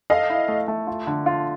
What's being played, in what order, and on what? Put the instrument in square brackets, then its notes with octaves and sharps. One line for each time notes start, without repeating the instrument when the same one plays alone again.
[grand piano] A4 [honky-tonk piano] D#5 F5
[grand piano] E4
A3
A3
F4
D3
F4